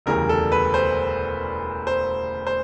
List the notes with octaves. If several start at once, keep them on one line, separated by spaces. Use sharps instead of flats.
E1 D2 C#3 E3 G3 A#4
A4
B4
C5
C5
C5